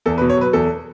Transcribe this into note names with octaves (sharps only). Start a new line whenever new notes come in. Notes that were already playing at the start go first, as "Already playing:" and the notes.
E2 A4
B4
B2
C#5
F#3 B4
E2 A4